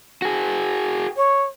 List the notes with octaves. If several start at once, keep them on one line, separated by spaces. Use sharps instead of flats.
F#4 G#4
C#5